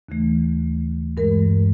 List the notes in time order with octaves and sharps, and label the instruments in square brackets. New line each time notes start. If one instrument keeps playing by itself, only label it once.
[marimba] D#2 C#3 E3 A3
G2 E3 G#3 A#4